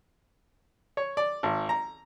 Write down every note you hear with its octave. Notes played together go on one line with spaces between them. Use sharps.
C#5
D5
G#1
A#5